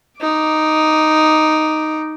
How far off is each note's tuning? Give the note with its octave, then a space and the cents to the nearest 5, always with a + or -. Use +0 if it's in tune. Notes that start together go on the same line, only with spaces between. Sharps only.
D#4 +0 D6 +0